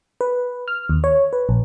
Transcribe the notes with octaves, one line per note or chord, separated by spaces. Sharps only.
B4
F6
D#2
C#5
B4
A#1